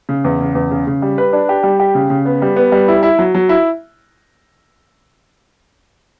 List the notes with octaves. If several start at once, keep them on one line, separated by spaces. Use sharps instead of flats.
C#3
E2
C#3
E2
C#3
C#3
G3
B4
D4
G4
G3
G4
C#3
C#3
B3
G3
B3
G3
E4
E4
F#3
F#3
E4